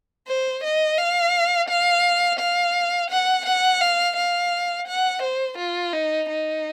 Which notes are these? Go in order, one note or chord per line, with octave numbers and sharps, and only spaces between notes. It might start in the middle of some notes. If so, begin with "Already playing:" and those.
C5
D#5
F5
F5
F5
F#5
F#5
F5
F5
F#5
C5
F4
D#4
D#4